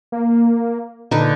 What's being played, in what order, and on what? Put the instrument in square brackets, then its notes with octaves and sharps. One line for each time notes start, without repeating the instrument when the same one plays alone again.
[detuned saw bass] A#3
[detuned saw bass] A#2 [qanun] D3 D#4 B4